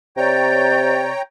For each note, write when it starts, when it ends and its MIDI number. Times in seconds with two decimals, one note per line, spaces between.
0.17 1.11 48
0.17 1.22 73
0.17 1.10 74
0.17 1.22 79
0.17 1.22 82
0.17 1.10 91